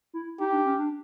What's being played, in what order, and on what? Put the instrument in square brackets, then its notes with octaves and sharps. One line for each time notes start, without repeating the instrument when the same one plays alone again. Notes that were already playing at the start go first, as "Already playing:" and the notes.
[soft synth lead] E4
[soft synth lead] D#4 [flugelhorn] G4
[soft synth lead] D4
C#4
D4